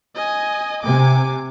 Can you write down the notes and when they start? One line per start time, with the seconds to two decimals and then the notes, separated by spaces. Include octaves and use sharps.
0.15 D#5 G#5
0.84 C3 G#5 D6